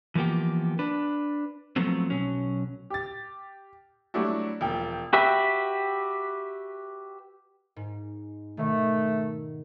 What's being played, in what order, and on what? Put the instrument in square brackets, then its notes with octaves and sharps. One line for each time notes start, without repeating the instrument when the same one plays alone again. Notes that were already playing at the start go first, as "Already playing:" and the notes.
[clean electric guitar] E3 F3 A#3 B3 G4
D4 B4
F3 F#3 A3 B3 C4
B1 F#3 C#4
[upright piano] G4 A6
F#3 G3 A3 D4 E4 F#4
E1 F3 G5
[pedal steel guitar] F#4 G4 B4 E5
[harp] G#2
[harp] B2 D#3 [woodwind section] A3